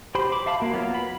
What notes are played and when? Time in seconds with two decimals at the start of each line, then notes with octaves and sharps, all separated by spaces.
0.15 G4 C5 B5 C6
0.32 B5 D6
0.46 E5 F5 A5 B5
0.60 A#3 F#4
0.73 F#3 B3 F4
0.95 B5